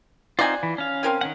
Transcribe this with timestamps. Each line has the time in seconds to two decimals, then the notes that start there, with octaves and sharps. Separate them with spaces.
0.39 C4 D#4 F4 D5 F#5 G#5
0.63 E3
0.78 C#4 F5
1.03 C4 A#4 G#5
1.21 D#3 C#4 F#5